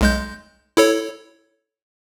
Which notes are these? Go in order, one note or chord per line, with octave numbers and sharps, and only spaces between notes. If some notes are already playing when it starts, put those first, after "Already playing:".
B1 G#3 G6
E4 A4 C#5